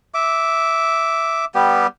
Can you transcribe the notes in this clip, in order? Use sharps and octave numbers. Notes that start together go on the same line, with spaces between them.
E5 D6
G3 B3 G4